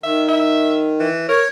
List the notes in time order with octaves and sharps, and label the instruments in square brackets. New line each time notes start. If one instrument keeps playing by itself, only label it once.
[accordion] D#3 [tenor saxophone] E5
[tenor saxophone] E5
E3
[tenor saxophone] A#4 [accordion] C#5